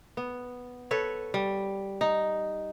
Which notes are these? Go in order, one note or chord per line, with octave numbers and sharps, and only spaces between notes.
B3
A4 B4 C#5
G3
D#4